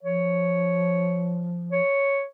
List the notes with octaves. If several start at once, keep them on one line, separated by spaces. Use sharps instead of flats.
F3 C#5
C#5